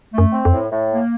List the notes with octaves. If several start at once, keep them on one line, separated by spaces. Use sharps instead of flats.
A3
F#2
C4
F2
A2
A2
A#3